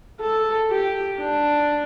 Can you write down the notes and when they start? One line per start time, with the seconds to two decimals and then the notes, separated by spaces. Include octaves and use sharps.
0.21 A4
0.70 G4
1.19 D4